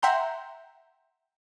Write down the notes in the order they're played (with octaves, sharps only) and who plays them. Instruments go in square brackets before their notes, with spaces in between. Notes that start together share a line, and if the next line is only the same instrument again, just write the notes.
[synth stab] E5 F#5 G5 A#5 C6 G6